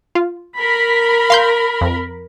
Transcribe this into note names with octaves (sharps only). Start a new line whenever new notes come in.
F4
A#4 B5
F5 C6 G6
F2